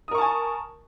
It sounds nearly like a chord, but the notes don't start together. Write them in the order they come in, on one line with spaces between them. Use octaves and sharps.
D#6 A#4 C#6 A5 G#5